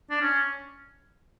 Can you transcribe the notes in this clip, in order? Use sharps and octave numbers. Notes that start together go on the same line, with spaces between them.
D4
C#4